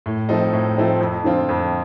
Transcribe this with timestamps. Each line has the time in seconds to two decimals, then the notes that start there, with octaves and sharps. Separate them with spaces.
0.06 A2
0.29 F3 A3 C4 D#4
0.53 A2
0.77 F3 A3 C4 D#4
1.01 F2
1.24 D3 F3 C4 F4
1.49 F2